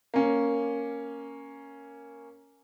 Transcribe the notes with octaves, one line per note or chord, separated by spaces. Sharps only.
A#3 C#4